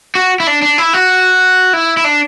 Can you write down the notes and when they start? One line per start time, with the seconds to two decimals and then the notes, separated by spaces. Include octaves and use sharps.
0.15 F#4
0.40 E4
0.47 D4
0.62 D4
0.78 E4
0.93 F#4
1.73 E4
1.97 E4
2.04 D4